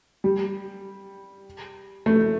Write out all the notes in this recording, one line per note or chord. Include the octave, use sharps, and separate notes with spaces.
G3
A3